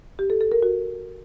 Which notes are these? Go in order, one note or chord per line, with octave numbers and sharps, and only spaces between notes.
G4
A4
A4
A#4
F#4